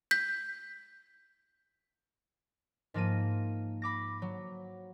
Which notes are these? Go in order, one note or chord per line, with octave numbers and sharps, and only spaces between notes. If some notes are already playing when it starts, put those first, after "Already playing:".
G6 B6
G#2 F3 A#3 A#6 D#7
B5 D6 A#6
F#3